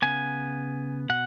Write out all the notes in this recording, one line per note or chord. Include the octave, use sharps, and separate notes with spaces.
C#3 B3 G#5
B2 F#5